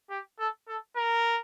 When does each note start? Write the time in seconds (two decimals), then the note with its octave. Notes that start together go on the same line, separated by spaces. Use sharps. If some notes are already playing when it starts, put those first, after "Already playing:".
0.10 G4
0.39 A4
0.68 A4
0.96 A#4